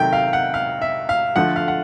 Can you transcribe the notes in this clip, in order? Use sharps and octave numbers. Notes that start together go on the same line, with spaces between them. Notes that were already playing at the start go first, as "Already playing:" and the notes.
Already playing: C3 D#3 F#3 A3 G5
F5
F#5
F5
E5
F5
D3 F3 A3 F#5
F5
F#5